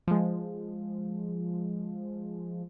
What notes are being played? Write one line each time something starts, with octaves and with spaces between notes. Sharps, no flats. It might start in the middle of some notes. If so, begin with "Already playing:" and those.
F3 G#3